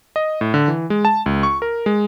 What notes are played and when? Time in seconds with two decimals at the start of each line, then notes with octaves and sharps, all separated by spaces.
0.16 D#5
0.41 A2
0.54 D3
0.68 E3
0.90 G#3
1.05 A5
1.26 C#2
1.43 C#6
1.62 A#4
1.86 G#3